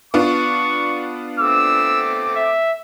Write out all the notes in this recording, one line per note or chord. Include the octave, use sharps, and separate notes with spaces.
B3 D4 F4 C#6
A3 C4 D6 E6
E5